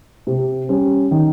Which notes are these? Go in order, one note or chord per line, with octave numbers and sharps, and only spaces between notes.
C3
G3 C#4
D#3